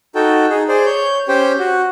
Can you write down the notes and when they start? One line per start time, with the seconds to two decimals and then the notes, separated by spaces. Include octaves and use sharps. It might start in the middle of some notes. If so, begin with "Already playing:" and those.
0.15 D#4 F#4 A4 G5
0.50 D#4 G#4
0.69 G#4 C5 D5
0.86 C#5 G6
1.28 C#4 G4 C5 G5
1.59 F#4